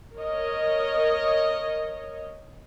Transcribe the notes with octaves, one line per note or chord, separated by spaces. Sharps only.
A#4 C#5 D#5